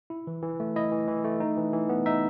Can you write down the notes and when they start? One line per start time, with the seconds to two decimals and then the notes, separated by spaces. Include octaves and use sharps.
0.10 E4
0.27 E3
0.42 E3
0.60 A3
0.76 E4 D#5
0.91 E3
1.08 E3
1.25 A3
1.40 D#4
1.57 E3
1.73 E3
1.89 B3
2.06 D#4 E5